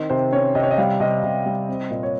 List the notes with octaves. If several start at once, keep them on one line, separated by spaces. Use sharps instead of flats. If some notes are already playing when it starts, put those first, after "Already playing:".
Already playing: D#3 C4 D#5
C3 C5
C#4 C#5
C3 D#5
C#5
D#5
G3 F5
C3 D#5
C3
G3
C4
A#2 D#5
C#5